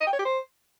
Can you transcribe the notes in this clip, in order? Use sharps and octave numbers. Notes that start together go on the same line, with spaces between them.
D#5
G5
C#5
G4
C5